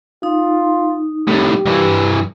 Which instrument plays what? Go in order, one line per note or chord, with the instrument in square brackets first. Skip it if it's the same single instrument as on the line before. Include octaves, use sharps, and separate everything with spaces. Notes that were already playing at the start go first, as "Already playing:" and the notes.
[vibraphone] D#4 [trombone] F4
[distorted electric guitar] C2 A2 [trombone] G4
[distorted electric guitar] G2 E3